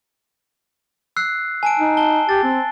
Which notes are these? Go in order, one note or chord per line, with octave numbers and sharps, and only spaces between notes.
E6 F#6 C7
G#5 A5 D7
D#4
A5 G7
G4 A6
C4